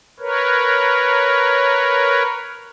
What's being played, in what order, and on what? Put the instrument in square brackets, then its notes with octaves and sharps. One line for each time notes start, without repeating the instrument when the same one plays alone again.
[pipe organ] A#4 B4 C#5